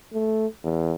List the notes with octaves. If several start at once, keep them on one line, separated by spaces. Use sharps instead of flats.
A3
E2